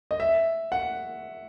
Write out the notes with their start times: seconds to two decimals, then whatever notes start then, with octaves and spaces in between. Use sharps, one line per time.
0.11 D#5
0.20 E5
0.72 F#5